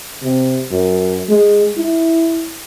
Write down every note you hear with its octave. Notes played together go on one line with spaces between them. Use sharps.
C3
F#2
G#3
E4